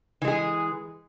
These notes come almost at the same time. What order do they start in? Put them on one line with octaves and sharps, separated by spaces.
E3 G#3 G#4